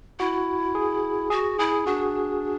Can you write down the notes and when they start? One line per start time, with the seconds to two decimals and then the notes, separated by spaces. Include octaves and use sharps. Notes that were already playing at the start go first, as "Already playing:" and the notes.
0.19 E4 F#4
0.75 G#4
1.30 F#4 G#4
1.59 E4 G#4
1.86 D4 F#4